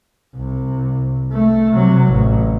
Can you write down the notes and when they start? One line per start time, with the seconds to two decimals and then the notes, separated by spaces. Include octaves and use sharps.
0.36 C2
1.32 A3
1.74 C3 F#3
2.07 A1